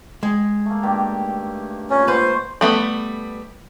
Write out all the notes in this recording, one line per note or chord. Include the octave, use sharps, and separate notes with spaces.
G#3 G#5
A3 A#3
G2 D#3 G4
A#2 C#4
G#2 B4 C5 C#6
G3 A3 B3